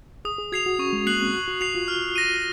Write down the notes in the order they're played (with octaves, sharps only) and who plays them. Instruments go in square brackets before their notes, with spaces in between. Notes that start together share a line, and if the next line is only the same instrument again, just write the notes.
[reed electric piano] G#4 [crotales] D#6
[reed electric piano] G#4
[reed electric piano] F#4 [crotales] G#6 C7 F7
[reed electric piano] F#4
[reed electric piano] C#4 [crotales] C#6
[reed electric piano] G#3
[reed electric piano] A#3 [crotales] F#6 C7 F#7
[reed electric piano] C4
[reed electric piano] F#4 [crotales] F#6
[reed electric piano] F#4
[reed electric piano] F#4 [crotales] C7 F7
[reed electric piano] F4
[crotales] F6
A#6 D#7